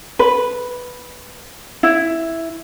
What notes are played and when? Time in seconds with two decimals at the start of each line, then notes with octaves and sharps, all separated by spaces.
0.19 B4
1.83 E4